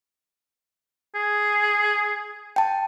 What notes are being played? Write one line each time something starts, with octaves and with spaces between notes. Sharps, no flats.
G#4
G5 A5